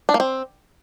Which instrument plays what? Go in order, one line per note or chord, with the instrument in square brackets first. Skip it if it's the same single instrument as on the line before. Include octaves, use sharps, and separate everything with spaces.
[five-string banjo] D4
A#3
C4